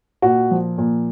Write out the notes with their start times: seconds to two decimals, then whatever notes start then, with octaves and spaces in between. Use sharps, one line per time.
0.22 A#2 F#4
0.51 F3
0.78 A#2